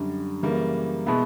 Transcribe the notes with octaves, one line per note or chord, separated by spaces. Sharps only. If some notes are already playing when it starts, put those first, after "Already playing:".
Already playing: F#2 D3 G3
F#2 C#3 E3 G3 A#3
B2 G#3 B3 E4